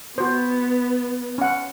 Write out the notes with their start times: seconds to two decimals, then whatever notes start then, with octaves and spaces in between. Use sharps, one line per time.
0.18 B3 F#4 C5
1.38 C#4 F#5